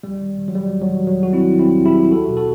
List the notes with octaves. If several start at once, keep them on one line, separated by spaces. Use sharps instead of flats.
D#2 G3
D#3
D#3
F#3
D#3 G3
D#2
F#3
D#3
D#2 F#3
D#2 F#4
C4 E4
D#3
D#3 C4 E4
D#2
E4 G4
D#2
C2 F#4 A4
B2
F#4 A4